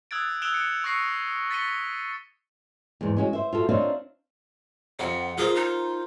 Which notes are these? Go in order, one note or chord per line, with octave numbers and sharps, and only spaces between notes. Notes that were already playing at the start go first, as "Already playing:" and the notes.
D#6 E6 F#6 G#6 A6 D7
E6 F#6 D7 E7 F7 G7
F#6 C#7 D7
C#6 E6 F#6 A#6 C7 C#7
A6 B6 C#7 D#7 G7
E2 G#2
G#3 C#4 F#4
C5 E5
F4 F#4 A4
C4 D4 D#4 F4 C#5 F5
F2 F#5
F4 G#4 A#4 C5
D#4